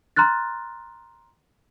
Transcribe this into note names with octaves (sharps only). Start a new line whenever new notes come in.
A#5 C6 F6 F#6 A6